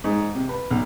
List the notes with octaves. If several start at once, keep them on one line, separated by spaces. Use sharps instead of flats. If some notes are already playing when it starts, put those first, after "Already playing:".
G#2
C3
B4
B1